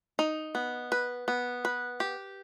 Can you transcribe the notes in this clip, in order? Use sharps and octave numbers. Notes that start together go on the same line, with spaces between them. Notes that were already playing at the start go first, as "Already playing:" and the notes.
D#4
B3
B4
B3
B4
G4